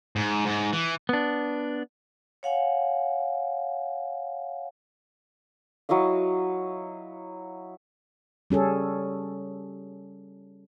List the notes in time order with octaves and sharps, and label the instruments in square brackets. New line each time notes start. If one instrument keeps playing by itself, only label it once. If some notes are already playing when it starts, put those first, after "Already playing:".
[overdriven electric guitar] G#2
G#2
E3
[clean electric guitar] B3 D4
[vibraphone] C#5 F5 F#5 G#5
[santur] F#3 E4 D#5 F5
[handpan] G3 C#4 G#4 A4